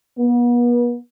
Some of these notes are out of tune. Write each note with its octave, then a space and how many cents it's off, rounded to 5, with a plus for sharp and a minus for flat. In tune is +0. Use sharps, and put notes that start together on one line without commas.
B3 -40